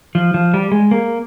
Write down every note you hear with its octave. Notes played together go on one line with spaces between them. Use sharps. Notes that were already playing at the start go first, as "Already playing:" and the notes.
F3
F3
G3
G#3
A#3